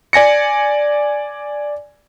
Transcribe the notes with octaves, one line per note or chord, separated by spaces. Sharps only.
D5 G#5 A#6 C#7